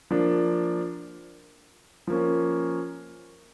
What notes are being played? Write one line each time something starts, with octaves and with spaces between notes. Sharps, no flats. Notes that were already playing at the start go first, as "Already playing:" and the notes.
F3 A#3 D4
F3 A#3 C#4